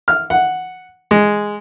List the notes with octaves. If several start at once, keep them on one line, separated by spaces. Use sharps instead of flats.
F6
F#5
G#3